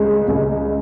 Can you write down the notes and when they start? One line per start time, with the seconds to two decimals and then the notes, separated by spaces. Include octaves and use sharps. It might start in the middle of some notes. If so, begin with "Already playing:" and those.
Already playing: C#2 C#3 G#3
0.28 C#2